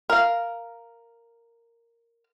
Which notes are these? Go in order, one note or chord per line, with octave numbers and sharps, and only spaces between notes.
A#4 F5